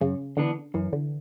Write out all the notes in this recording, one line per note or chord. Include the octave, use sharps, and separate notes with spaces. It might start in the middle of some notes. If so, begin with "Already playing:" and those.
F#2 C#3
D3 E3 B3 D4
F#2 E3
D3